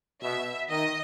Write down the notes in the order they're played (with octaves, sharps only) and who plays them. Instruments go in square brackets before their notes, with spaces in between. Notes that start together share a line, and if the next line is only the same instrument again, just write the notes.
[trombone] B2 [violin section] E5
[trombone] D#3 [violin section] D#5